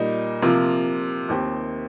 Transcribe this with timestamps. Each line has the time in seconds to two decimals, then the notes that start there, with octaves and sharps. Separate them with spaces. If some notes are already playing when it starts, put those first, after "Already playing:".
Already playing: A#2 G3 D#4
0.42 C3 F3 A#3 F4
1.28 D#2 D#3 C4 G4